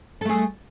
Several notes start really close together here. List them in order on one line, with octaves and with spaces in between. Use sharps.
A4 A3 G#4